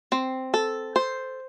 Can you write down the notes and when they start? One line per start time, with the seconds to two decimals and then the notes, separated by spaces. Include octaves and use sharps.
0.12 C4
0.54 A4
0.96 C5